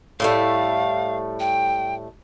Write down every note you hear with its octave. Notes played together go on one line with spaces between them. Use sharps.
A2 G3 A3 F5
G5